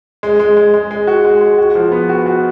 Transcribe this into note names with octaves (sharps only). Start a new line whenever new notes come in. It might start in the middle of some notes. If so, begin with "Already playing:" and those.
G#3
G#3
G#3
G#3
G#3
F#4
G#3
G#3
F#4
F3
B3
F#4
F#4